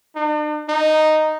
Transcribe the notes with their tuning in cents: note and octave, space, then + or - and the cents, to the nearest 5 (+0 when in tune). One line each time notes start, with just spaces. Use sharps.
D4 +45
D#4 -5